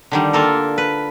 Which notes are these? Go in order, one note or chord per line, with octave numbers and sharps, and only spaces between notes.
D3 D#3 G3
A#3 F4 A4 A#4
B4